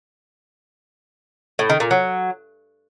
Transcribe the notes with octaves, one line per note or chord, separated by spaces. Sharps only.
A2
D#3
A#2
F#3